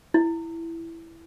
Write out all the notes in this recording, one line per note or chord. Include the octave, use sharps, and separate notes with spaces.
E4